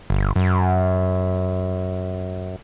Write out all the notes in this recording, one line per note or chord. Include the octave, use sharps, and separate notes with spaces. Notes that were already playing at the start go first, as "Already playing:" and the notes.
G1
F#2